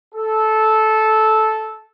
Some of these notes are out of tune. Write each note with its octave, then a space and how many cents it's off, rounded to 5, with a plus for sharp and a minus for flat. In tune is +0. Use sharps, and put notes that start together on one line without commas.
A4 -10